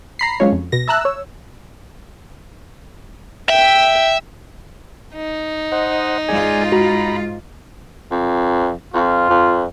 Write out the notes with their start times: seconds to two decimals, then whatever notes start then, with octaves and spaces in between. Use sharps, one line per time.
0.19 A#5 B5 C7
0.40 F3 F#3 G#3 C#4 F4 C#5
0.52 F2
0.72 B2 A#6
0.88 E5 A5 A#5 E6 F#6
1.01 C#5 E6
3.50 E5 G5
5.15 D#4
5.72 C5 D#5 F#5
6.28 G#2 F4 G#4 D5 G#5
6.72 F#4 A#5 B5
8.11 F2
8.94 F2 F4
9.30 F2